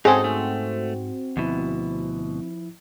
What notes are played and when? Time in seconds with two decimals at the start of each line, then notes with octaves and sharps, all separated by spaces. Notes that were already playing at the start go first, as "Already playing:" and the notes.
0.05 G#2 C4 D#4 F#4 G#4 A4
0.24 A3
1.37 D2 B2 F3 E4